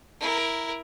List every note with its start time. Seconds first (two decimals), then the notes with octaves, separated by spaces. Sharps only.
0.20 E4 A#4